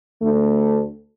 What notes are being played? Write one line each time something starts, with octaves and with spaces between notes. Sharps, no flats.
D2 D3 A3